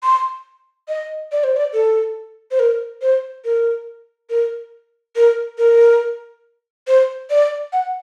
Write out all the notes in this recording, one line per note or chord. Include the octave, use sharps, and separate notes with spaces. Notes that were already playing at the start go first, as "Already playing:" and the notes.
C6
D#5
D5
C5
D5
A4
C5
A#4
C5
A#4
A#4
A#4
A#4
C5
D5
F#5